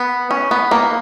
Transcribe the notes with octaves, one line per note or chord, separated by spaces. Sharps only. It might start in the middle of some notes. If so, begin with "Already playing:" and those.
Already playing: B3
C#4
B3
A#3